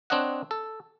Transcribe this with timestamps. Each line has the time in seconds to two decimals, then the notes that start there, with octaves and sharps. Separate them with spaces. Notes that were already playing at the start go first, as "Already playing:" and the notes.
0.10 C4 D4 C#5 D#5 F#5
0.51 A4